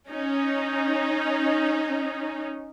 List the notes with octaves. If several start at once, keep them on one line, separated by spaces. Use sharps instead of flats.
C#4 D#4